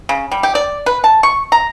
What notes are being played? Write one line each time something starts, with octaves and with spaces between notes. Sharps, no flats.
C#3
G3
G4
D5
B4
A5
C#6
A#5